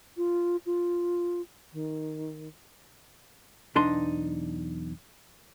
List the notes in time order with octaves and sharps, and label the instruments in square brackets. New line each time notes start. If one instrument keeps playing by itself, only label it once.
[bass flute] F4
F4
D#3
[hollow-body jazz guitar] B1 E2 D4 D#4 C6